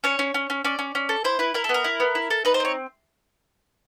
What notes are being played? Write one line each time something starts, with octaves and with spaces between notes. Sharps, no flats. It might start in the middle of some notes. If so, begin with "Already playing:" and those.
C#4 C#5
C#4
C#4
C#4
C#4 D5
C#4
C#4
A4
E4 C5
E4 B4
E4 A#4
A4
B3
A#4
E4
B3
E4
A4
D#4 B4
C5
C4 C#5